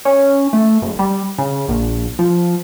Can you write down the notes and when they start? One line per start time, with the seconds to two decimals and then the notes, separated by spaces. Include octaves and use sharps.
0.05 C#4
0.53 A3
0.82 F#1
0.99 G3
1.38 C#3
1.68 A#1
2.19 F3